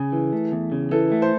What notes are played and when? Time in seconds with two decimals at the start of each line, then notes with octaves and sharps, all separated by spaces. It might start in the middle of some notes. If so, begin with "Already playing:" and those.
Already playing: C#3 G#4 G#5
0.12 E3
0.33 A3
0.52 E2
0.72 C#3
0.91 E3 A4
1.11 A3
1.22 C5